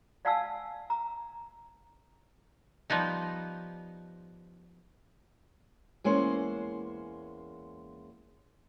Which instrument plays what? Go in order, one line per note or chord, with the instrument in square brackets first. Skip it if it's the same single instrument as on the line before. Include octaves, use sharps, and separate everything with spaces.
[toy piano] D5 F5 F#5 G#5 A5 E6
A#5
[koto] F3 G3 B3 D#4
[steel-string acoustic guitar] E2 G#3 A#3 C#4 C5